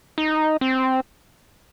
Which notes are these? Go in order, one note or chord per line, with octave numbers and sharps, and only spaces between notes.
D#4
C4